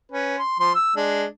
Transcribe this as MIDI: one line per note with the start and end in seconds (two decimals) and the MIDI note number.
0.11 0.37 61
0.11 0.37 71
0.39 0.56 84
0.59 0.72 53
0.59 0.72 84
0.74 0.96 88
0.96 1.25 56
0.96 1.25 62